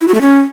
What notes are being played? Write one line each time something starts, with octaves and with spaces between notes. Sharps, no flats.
E4
F#4
A3
C#4